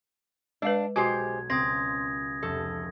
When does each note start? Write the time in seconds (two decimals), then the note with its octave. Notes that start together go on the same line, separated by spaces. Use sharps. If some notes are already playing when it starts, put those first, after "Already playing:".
0.62 G#3 D4 B4 F5
0.96 B1 G#3 F#4 G4 C5 G#6
1.50 C#2 A#3 C4 D#6 G#6 A#6
2.43 F1 A4